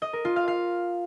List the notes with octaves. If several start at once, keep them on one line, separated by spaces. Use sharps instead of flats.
D#5
A#4
F4
F5
F5